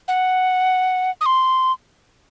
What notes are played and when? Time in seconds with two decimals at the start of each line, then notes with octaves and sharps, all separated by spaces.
0.08 F#5
1.21 D#6
1.26 C6